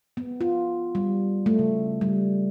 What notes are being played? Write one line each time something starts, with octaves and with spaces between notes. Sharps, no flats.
B3
F4
G3
A3
C#3
G3